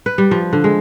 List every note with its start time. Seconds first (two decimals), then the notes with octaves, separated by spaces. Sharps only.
0.06 B4
0.18 G3
0.31 F3
0.53 D3
0.64 G#3